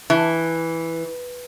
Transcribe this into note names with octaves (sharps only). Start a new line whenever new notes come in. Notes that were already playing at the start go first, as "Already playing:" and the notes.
E3